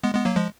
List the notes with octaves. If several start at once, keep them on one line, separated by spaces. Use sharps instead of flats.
G#3 B3
G#3 B3
F#3 A#3
F3 G#3